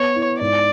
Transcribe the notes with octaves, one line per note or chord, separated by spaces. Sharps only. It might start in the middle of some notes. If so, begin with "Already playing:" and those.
Already playing: B3 C#5
E4
G#2 D5